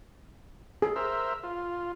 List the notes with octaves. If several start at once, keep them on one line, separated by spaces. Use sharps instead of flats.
G#4
A#4 C5 E5
F4